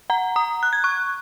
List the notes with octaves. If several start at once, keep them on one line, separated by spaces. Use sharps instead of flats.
F#5 A#5
A#5 D#6
F#6
G#6
C#6 F#6